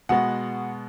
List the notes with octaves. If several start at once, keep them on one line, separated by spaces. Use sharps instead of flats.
B2 G#3 B3 F#4 F#5